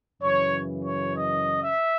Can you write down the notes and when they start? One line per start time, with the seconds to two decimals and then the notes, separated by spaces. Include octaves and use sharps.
0.22 F#2 C#3 E3 C#5
0.84 C#5
1.15 D#5
1.62 E5